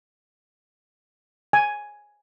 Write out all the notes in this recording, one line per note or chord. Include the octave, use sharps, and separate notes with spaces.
G#5